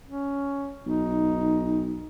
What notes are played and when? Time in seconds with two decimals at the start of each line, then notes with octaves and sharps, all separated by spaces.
0.07 C#4
0.86 B1 D#4